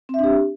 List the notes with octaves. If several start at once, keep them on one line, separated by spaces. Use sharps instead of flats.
C4 D4 G4 E5